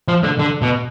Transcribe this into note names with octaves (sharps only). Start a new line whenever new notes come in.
F3
D3
D3
B2